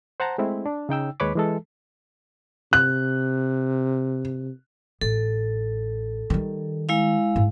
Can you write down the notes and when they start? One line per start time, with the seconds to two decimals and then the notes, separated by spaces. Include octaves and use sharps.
0.20 C5 F#5 A5 A#5
0.38 G#3 A3 C4 E4
0.66 D4
0.89 C#3 D#4 G5 E6
1.20 D#2 G#3 B4 C#5 B5 D6
1.35 E3 G#3 A4
2.73 C3 F#6
5.01 A1 A4
6.30 D#3 G3
6.89 G#3 E4 F5
7.36 G#2